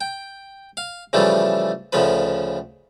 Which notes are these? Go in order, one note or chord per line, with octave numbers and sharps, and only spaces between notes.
G5
F5
C#3 E3 F3 G3 A3
D2 C#3 F3 B4